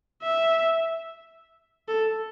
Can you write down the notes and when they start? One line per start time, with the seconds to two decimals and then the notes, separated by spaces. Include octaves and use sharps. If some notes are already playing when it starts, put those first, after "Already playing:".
0.22 E5
1.88 A4